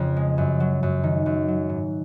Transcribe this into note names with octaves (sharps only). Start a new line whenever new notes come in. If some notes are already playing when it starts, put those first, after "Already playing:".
Already playing: F2 C#3
G#3
F#2
F#3
F#2
D#3
F#2
F#3
G#2